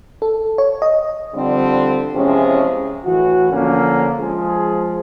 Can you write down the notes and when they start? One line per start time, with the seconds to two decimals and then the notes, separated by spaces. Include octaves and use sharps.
0.22 A4
0.58 C#5
0.82 D#5
1.34 D3 F3 G3 C4 D4
2.14 C3 E3 F3 G#3 C#4
3.05 A2 E3 F#4
3.52 D3 F3 A#3 C#4
4.19 F3 G#3 G#4